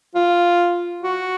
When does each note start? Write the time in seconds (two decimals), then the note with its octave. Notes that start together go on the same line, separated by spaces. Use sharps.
0.15 F4
1.03 F#4